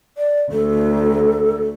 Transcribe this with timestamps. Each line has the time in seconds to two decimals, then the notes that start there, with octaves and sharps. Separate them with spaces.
0.17 D5
0.52 D2 A4